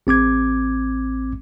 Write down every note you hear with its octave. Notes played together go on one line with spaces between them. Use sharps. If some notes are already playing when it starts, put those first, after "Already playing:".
A1 C4 D6 G#6